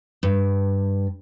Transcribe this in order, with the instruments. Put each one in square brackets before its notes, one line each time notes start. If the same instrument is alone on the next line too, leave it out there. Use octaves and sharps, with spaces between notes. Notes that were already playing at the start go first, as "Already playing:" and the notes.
[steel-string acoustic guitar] G2